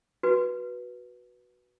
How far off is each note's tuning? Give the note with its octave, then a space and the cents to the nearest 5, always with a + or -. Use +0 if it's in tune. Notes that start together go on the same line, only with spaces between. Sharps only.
F#4 +0 B4 -10